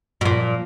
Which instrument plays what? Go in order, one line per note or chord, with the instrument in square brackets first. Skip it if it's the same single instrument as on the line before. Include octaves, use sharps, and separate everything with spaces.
[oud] B2
[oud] A#2 [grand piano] F3